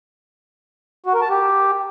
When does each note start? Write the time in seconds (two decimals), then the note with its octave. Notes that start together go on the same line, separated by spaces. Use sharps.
1.06 F#4
1.14 A#4
1.22 A5
1.30 G4